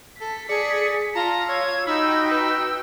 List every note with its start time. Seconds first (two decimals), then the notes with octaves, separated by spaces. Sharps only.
0.21 A4 B6
0.49 G#4 D5 C#7
1.15 F4 A5 A#5
1.49 C#5 E6 G#6
1.87 D#4 F#4 G5 B5 E6
2.31 B4 E6